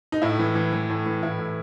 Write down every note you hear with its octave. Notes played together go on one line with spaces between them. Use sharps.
D#4
A2 E4
E3
E3
E3
A2
E3
A2 E4
A2